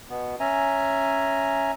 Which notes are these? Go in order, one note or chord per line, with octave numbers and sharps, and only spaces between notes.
B2 B3
C#4 E5 G#5 A#5